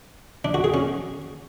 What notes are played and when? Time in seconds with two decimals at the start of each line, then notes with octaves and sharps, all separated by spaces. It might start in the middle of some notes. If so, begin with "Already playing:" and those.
0.45 D4
0.54 F#4
0.64 G#4
0.74 C#4